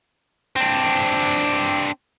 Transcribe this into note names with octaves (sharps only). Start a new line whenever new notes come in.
C4 D4